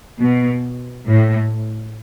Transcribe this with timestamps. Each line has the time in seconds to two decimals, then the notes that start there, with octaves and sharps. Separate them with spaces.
0.20 B2
1.07 A2